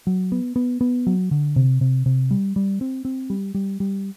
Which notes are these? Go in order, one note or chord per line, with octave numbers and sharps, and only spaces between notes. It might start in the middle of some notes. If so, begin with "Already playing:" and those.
F#3
B3
B3
B3
F#3
D3
C3
C3
C3
G3
G3
C4
C4
G3
G3
G3